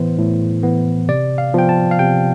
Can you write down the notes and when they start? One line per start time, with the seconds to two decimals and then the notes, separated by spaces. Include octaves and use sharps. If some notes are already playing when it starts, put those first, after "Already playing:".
Already playing: A2 E3 B3 C5
0.19 A2
0.63 E3 B3
1.08 C3 D5
1.38 F5
1.54 F3 B3 G5
1.69 A5
1.91 F5
1.99 C3 G5